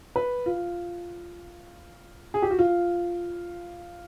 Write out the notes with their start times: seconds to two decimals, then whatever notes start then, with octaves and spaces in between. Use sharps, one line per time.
0.16 B4
0.46 F4
2.34 G#4
2.42 G4
2.51 F#4
2.59 F4